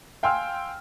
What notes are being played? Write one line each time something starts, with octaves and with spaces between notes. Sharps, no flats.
F5 G5 G#5 C6 E6 F6